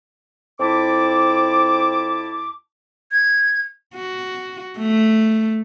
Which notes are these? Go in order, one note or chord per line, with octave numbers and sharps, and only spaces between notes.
F2 C4 E4 A5 D6
G#6
F#4
A3